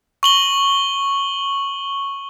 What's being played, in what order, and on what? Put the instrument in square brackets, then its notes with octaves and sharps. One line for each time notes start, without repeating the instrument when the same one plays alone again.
[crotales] C#6 F#7 G7